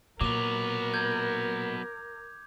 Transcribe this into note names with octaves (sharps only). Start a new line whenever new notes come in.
A#2 F#3 B3 A#4 D6 F7
G6 G#6